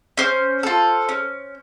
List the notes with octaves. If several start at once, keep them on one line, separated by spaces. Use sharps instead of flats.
C#4 C5
F4 A4
C#4